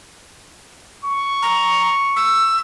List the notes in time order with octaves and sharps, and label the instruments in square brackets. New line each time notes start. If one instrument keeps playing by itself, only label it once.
[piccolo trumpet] C#6
[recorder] A#5
E6